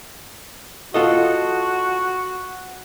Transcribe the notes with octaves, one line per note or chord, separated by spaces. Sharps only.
F4 F#4 A4 D#5